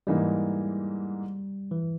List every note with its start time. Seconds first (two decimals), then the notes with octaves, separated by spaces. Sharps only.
0.07 G#2 E3 G3 A#3 D#4
1.71 E3